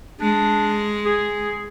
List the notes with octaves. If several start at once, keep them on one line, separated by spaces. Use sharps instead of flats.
G#3 D4
G#4